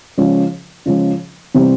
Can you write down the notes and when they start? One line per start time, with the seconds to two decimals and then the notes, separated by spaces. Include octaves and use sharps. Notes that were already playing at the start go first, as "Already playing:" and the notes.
0.18 C#3 F3 G#3 C#4
0.86 C#3 F3 G#3 C#4
1.55 C3 E3 G3 C4